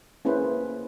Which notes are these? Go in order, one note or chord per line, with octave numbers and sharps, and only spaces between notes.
A#3 C#4 E4 G#4 B4 C5